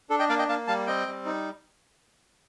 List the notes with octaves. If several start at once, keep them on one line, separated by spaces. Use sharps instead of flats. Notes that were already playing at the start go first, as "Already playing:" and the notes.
D4 A4
D#5 G5
A#3 D5 F5
D#5 G5
A#3 F5 A5
G3 F5 A5
C4 D#5 G5
G3
D#4